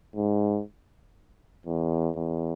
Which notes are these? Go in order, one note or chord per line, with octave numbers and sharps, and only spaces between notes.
G#2
E2
E2